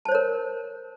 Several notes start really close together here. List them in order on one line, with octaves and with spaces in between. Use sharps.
A5 C5 C#5 A#4